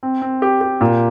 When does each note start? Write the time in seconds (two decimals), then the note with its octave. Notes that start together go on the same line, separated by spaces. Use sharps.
0.03 C4
0.22 C4
0.42 G4
0.61 G4
0.81 A#2